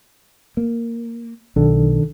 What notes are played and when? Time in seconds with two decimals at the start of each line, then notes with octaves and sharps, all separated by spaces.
0.57 A#3
1.56 B1 D#3 D4 A4